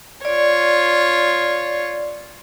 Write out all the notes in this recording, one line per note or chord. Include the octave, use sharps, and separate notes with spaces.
F4 C#5 D5